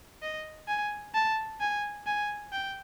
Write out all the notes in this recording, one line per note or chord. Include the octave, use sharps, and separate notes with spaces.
D#5
G#5
A5
G#5
G#5
G5